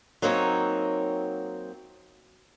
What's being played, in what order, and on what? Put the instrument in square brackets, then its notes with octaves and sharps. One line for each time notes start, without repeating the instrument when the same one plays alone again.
[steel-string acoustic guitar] F#3 A#3 C4 D#4 C#5